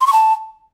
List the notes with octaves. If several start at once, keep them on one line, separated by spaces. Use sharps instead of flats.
C6
C#6
A5